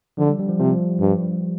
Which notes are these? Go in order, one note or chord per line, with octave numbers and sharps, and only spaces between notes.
D3 F3
G3
G3
F3
C3 F3
G2